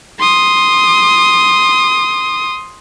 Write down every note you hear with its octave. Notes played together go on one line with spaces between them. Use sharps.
C6 D#6